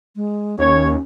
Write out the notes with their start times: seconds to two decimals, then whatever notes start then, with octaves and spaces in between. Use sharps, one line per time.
0.16 G#3
0.59 D#2 C#4 C#5